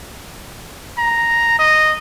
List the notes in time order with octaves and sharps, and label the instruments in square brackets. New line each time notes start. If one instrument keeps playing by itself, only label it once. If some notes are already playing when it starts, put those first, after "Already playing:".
[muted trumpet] A#5
D#5